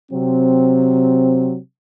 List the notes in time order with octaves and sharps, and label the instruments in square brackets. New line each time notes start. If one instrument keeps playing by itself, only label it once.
[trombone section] C3 F#3 C4